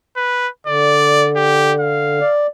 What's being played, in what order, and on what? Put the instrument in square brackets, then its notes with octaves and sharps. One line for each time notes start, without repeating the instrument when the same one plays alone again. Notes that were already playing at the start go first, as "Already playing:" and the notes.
[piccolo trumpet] B4
[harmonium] D3 [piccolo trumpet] D5
[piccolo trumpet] G4
F5
[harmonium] D5